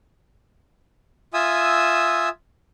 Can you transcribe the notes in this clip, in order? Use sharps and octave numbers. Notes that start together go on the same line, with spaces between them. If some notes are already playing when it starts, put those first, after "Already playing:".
F4 E5 G#5 D#6 E6